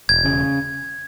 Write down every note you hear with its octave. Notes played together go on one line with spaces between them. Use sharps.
E1 G#6
C#3